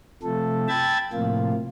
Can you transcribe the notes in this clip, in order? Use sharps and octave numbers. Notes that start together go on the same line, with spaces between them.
C3 F3 A3 A4
G5 A5 B5 E6 G#6 A6
A2 C3 F3 A#3 F4